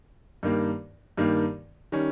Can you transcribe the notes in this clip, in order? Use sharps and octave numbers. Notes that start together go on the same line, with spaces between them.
G2 D#3 A#3
G2 D#3 A#3
D#3 G3 C#4